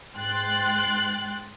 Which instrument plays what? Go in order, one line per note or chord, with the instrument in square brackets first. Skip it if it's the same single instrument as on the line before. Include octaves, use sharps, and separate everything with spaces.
[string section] G#2 G5 C6 F#6 A6